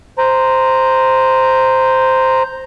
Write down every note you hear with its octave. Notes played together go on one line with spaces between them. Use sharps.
C5 A#5